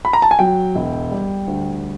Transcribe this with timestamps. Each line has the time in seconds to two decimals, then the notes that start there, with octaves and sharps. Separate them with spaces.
0.05 B5
0.13 A#5
0.22 A5
0.31 G#5
0.39 F#3 G5
0.75 E1
1.11 G3
1.48 D2